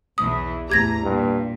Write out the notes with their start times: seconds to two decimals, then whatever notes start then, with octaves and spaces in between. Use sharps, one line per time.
0.18 B1 E2 E3 D#6
0.70 E2 A2 G4 A#5 G#6 A#6
1.03 G2 A#2